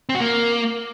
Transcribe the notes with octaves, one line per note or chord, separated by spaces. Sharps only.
C4
F#4
A#3